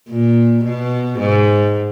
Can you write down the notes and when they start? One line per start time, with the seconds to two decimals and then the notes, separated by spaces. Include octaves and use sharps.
0.11 A#2
0.64 B2
1.19 G#2